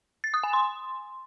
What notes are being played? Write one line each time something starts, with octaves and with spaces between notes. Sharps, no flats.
A6
D#6
G#5
C6